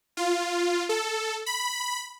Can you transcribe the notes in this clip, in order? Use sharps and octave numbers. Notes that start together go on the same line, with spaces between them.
F4
A4
B5